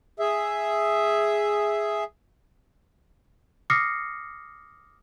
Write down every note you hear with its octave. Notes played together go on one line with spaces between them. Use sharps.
G#4 E5
D6 D#6 F6 A#6 C7 C#7